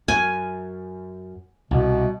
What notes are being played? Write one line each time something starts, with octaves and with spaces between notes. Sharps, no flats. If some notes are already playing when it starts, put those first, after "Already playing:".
F#2 G#5
C2 B2